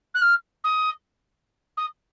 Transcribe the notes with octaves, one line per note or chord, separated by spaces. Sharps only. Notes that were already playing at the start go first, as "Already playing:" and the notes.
F#6
F6
D#6
D#6